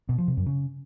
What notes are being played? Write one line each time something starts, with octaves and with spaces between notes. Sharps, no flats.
B2
F3
C3
F#2
C#3